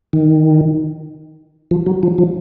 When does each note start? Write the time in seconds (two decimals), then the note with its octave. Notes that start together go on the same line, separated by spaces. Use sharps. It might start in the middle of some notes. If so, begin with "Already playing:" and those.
0.13 D#3
1.71 F3
1.86 F#3
2.03 F3
2.18 F3